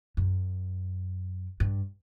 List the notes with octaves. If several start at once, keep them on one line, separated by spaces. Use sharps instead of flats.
F#2
G2